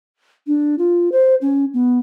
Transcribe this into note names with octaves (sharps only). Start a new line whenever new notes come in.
D4
F4
C5
C#4
B3